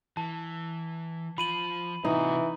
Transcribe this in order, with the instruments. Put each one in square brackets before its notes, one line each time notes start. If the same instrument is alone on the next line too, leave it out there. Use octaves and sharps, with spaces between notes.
[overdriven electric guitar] E3 [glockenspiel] A5
[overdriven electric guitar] F3 F4 [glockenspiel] B5 D#7 F#7
[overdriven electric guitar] C3 F#4 [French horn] E3 [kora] D#4